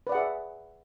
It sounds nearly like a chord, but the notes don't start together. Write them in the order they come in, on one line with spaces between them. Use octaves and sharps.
B4 D5 F#5 G#4 E5